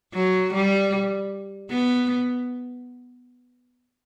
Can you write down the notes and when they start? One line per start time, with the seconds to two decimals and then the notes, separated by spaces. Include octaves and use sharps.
0.14 F#3
0.54 G3
1.71 B3